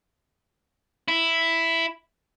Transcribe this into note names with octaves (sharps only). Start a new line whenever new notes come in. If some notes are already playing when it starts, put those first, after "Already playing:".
E4